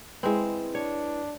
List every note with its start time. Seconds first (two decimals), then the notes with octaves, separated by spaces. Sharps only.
0.23 G#3 C4 E4 B4
0.75 D4 C#5